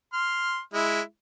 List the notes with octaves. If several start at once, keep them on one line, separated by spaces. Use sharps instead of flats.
C6 F6
G#3 E4